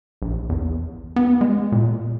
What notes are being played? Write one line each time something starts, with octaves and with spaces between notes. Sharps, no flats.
A#1
E2
B3
G#3
A#2